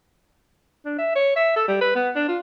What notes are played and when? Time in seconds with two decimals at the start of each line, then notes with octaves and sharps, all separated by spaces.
0.86 D4
0.99 E5
1.16 C#5
1.36 E5
1.56 A4
1.68 G3
1.81 B4
1.95 B3
2.15 D4
2.28 F4